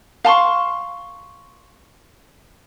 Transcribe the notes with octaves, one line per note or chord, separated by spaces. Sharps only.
F5 A5 C6 C#6